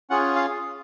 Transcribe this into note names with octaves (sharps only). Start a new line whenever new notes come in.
C#4 F4 G#4 F#5
F5